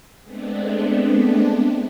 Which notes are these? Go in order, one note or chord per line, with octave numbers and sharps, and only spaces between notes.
G#3 A3 B3 C4 D4